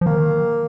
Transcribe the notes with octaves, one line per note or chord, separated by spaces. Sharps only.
F3
D#3 A#3